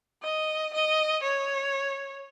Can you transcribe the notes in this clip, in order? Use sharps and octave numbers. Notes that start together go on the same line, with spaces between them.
D#5
D#5
C#5